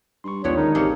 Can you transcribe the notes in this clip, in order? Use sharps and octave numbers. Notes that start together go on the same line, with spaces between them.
G2 C6 C#6
D#1 A#1 D#2 D3 G3 B3 F4 C#5
G#2 D#3 D#4 A#4
A1 C3 A#3 G#4 A4 C#5 C#7